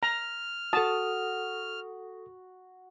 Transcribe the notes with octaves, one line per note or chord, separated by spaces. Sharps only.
A#5 F6
F#4 A4 A5 D#6